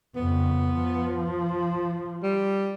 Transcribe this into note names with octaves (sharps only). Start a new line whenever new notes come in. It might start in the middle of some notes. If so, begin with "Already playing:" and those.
F2 C#3 B3
F3
G3